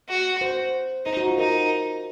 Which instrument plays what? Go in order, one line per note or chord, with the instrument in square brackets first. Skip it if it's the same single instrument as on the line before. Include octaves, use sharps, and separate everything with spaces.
[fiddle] F#4
[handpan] C5
[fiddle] D#4 [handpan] C5
[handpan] F#4
F4
[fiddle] D#4 [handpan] A#4